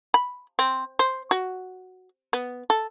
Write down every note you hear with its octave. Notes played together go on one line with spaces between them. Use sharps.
B5
C4
C5
F#4
B3
A4